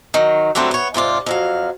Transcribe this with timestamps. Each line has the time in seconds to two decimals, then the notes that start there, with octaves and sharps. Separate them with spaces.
0.14 D#3 F#3
0.55 D3 F#3 G3 A3 C4
0.71 B3 C#5
0.94 G#2 C3 F4 D5
1.26 F2 F#3 F5